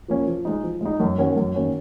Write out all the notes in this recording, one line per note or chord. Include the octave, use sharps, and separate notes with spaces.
F3 A#3 C#4
F3
G#3 D#4
F3
G#3 D#4
F#2
D#3 A#3 C#4 F#4
F#2
D#3 A#3 C#4 F#4